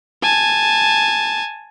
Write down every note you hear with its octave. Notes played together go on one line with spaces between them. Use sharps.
G#5 A5